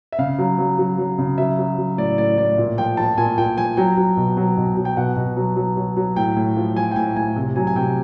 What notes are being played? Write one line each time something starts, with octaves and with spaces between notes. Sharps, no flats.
E5
C#3 F5
F#3
F#3
F#3
F#3
C#3
F#3 E5
F#3
F#3
A2 D5
A2 D5
A2 D5
A#2
F3 G5
F3 A5
A#2 G#5
A#2 G5
F3 G#5
F#3 G5
F#3
B2
F#3
B2
F#3
G5
B2 F#5
B2
F#3
F#3
F#3
F#3
A2 G5
A2
F3
F3 G#5
G5
A2 G#5
A2 G#5
C3
F#3 G#5
G#5
C3 G5